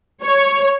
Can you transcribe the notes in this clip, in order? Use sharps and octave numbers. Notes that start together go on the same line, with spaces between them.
C#5